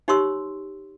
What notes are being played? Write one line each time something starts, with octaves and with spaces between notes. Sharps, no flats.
D#4 G4 C#5 C6 C#6 E6